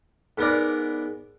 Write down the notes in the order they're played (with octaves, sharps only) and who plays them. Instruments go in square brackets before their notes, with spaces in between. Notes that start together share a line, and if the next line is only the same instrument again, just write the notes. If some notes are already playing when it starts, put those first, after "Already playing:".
[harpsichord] G#2 B3 A#4 D5